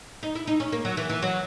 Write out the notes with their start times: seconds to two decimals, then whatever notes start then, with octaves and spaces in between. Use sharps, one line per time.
0.23 D#4
0.35 E4
0.47 D#4
0.60 C#4
0.72 A#3
0.85 F#3
0.97 E3
1.09 E3
1.22 F#3